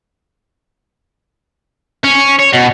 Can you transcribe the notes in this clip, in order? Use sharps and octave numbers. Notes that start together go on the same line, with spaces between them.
C#4
C#5
B2